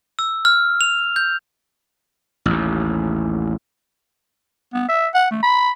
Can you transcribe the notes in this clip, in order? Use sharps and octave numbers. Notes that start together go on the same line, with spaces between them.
E6
F6
F7
G6
A1 D#2
B3
E5
F#5
A3
B5